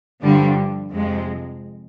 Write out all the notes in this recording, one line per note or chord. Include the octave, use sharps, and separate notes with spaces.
G2 D3 F3 G3
F2 C3 F3 G#3